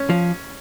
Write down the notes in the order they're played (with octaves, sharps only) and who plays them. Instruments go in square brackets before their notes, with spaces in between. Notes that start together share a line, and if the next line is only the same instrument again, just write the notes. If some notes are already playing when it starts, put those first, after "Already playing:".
Already playing: [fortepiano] C#4
[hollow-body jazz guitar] F3